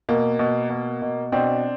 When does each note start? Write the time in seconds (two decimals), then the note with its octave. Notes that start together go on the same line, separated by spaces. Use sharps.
0.09 B2 A#3
0.39 B2
0.70 B2
1.02 B2
1.32 B2 C4 D4